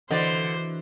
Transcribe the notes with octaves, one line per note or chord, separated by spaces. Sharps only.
D3 E3 F#4 C5 D5 D#5